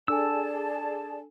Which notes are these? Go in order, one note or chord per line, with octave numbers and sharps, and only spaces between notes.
D4 G#4 A4 D5 G#5 A5 E6